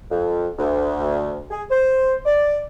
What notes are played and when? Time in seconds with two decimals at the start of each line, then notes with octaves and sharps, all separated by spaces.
0.10 F2
0.59 D2
1.51 G#4
1.70 C5
2.25 D5